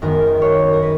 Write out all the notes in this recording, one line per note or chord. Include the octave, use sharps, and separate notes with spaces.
F#2 D#3 G#3 B3 A#4
C#5
A#4
A#3 B4